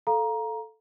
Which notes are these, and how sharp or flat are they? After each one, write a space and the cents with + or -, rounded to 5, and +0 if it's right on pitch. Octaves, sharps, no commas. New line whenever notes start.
A4 +0 F5 +0 A#5 +15